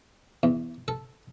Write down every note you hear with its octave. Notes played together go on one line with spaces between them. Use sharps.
E2
A4